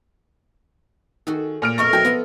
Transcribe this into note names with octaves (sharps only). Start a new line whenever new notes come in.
D#3 F#4 G#4 A4
A#2 F6 D7
F2 B2 E4 A#4 C#6
F#3 F#4 E5 G5
F3 B3 A4 B5